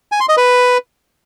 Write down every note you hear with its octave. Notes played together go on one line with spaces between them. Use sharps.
G#5
C6
D#5
B4